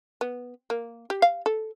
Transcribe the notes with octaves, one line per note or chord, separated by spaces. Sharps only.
B3
A#3
G4
F5
A4